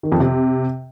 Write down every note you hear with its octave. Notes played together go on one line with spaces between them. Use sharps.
D#3
F2
C3